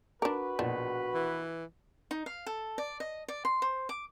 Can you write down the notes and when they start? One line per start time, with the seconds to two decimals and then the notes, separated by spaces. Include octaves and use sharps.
0.22 D4 F#4 A#4 B4 D6
0.59 A#1 B2 D4
1.15 E3
2.11 D#4
2.26 F5
2.46 A4
2.78 D5
3.00 D#5
3.28 D5
3.45 C6
3.62 C5
3.89 D6